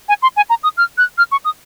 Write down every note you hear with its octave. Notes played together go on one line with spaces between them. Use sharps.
G#5
C6
G#5
A#5
D#6
F6
F#6
F6
C#6
D#6